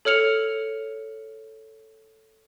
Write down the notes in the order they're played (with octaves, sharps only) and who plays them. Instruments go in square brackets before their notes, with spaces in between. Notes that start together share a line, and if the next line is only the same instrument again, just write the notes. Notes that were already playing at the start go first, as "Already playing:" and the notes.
[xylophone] A4 C#5 F6 C#7 F7